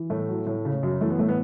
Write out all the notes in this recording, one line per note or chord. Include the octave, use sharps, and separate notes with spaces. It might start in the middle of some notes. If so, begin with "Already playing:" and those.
Already playing: E3
A2 A3
F#3
A2
C#3
F#2
E3 A3
B3
A2 A3
B3